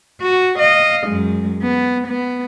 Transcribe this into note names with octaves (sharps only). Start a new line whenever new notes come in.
F#4
D#5 F5
F#2 G#3
B3
B3